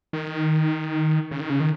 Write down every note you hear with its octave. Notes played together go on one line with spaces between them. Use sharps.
D#3
C#3
D#3
C#3
D#3